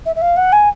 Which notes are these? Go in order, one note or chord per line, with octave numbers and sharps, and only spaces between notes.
E5
E5
F5
F#5
G#5